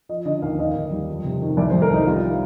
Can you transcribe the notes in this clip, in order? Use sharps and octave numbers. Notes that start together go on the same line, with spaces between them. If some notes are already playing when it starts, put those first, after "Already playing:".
F3 D#5
D3 D#5
D#2 F5
D#2 D#5
D#2
G3
F2
C3
D#3
C2 D5
C5
C2
A#4
C2 D#4
G3 F4